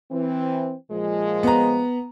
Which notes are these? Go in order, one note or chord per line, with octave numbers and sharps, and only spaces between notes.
E3 C4
A#2 F3 G#3
B3 A#5